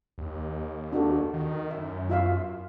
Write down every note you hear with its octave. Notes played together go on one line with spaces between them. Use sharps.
D#2
D4 F#4 A4
D#3
F#2 E5
F4 E5 F5